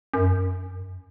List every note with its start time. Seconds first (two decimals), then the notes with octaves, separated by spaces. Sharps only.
0.14 F#2